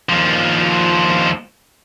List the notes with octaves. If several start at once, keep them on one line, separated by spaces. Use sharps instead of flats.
D#2 F3